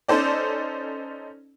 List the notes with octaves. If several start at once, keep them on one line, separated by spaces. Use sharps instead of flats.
C#4 D#4 A4 C5 D5